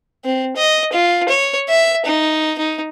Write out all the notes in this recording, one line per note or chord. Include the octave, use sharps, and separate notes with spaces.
C4
D#5
F4
C#5
E5
D#4
D#4